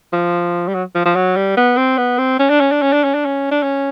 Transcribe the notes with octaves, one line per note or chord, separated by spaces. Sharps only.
F3
G3
F#3
F3
F3
F#3
G3
B3
C4
B3
C4
C#4
D4
C#4
D4
C#4
D4
C#4
D4
C#4
D4
C#4